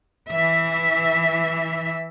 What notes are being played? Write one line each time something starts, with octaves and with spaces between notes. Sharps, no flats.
E3 E5